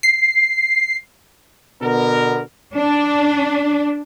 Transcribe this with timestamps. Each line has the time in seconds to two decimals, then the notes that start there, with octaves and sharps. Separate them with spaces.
0.03 C7
1.81 B2 D3 B3 A#4
2.74 D4